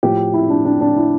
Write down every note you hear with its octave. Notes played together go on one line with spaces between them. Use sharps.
A2 F3 A3 G4
E4
D4
D4
D4
E4